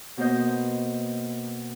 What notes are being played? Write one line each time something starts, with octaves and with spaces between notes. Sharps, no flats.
B2 A#3 B3 C5 D#5 G6